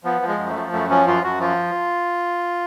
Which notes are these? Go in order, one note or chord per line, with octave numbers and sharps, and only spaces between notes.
F3 B3
F3
G#3
F#2
A3
F3
F#2 A3
F3 C#4
F#2 F4
F#2 F#4
F3 F4